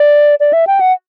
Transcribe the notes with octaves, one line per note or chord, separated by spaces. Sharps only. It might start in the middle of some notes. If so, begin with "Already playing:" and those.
Already playing: D5
D5
E5
G5
F#5